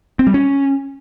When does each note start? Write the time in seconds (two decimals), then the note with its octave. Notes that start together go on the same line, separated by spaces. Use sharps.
0.19 C4
0.27 G3
0.34 C#4